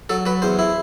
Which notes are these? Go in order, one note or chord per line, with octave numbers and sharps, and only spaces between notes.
F#3 A4
F#3 B4
E2 C5
E4